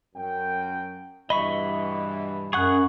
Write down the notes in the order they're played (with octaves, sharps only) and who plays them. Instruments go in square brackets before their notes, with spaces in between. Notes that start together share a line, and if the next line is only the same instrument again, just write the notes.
[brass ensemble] F#2 G5
[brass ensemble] G2 B2 E3 [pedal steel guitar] D#5 E5 C#6 [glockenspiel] B5
[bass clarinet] F#2 [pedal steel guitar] G#4 F#5 F#6 [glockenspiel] C#6